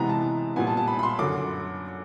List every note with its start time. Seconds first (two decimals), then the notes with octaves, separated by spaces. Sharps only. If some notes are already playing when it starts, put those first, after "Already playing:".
Already playing: C3 E3 G#3 B3 A#5
0.09 A5
0.56 A#2 G3 B3 G#5
0.67 A5
0.77 A5
0.88 B5
0.99 B5
1.03 C6
1.19 F#2 D3 F#3 D6